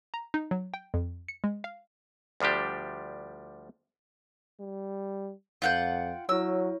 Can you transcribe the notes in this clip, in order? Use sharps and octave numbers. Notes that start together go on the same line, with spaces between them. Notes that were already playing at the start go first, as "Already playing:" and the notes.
A#5
D#4
F#3
G5
F2
C#7
G#3
F5
D2 F3 G3 D4 G4
G3
F2 F4 F#5 G5
F#3 E4 C#5 E6